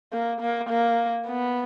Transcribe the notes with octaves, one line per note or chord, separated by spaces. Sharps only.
A#3
A#3
A#3
B3